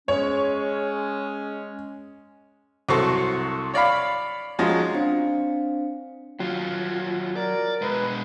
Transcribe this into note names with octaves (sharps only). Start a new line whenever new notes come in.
G#3 C#4 C#5
C2 F#3 A4 C5 C6 C#6
C#5 D5 F5 B5
F3 G#3 C#4 D#4 F#4
C4 D4 C5 F5 C#7
D#2 F#3 F4
A#4 D5
B2 G#3 B4